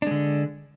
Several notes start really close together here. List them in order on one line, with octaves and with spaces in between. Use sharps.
D4 G#3 D3